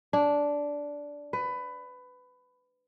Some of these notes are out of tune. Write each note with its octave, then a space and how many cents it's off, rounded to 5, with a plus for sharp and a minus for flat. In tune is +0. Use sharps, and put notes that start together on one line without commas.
D4 -10
B4 +20